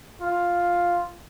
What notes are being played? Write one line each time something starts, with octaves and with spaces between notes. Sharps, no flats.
F4